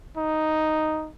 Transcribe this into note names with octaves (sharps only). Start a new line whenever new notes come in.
D#4